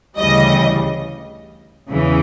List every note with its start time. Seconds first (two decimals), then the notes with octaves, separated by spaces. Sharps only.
0.18 D2 C#3 E3 G3 D#5
1.91 E2 C#3 E3